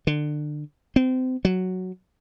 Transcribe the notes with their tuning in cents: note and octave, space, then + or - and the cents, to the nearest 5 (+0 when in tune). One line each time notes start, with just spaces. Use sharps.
D3 +25
C4 -30
F#3 +0